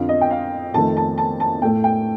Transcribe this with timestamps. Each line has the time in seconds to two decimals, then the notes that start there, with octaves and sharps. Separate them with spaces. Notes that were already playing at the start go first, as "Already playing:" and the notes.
Already playing: F2 D3 F3 F5
0.09 D#5
0.21 G5
0.30 F5
0.74 F2 D#3 A3 A5
0.97 A5
1.18 A5
1.40 A5
1.62 A2 A3 G5
1.84 G5